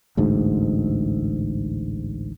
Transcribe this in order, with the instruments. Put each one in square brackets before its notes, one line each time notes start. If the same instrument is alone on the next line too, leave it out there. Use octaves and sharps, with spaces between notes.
[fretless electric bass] A1 D2 G#2